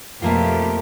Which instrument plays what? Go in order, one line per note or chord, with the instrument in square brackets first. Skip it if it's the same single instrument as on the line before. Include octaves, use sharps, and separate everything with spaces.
[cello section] F2 B2 G4 [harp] A3 A#3 F4